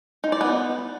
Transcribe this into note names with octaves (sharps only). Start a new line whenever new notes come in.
D#4
D5
B3